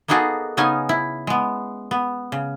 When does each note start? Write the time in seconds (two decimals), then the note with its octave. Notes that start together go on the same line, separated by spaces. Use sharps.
0.08 A#3 B3 D#4 F#4 G#4 A4
0.57 C#3 B3 C#4 D#4 G#5
0.89 E4
1.27 G#3 B3
1.91 B3
2.32 C#3